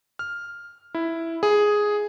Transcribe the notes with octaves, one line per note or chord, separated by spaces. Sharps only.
F6
E4
G#4